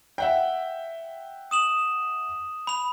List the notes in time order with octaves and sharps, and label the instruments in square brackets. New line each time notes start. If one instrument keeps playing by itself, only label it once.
[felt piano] E5 F#5 G5
[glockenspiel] D#6 E7 F#7
B5 F7